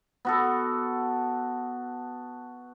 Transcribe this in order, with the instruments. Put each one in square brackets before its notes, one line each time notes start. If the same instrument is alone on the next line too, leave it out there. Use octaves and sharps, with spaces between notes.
[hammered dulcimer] B3 F#4 A4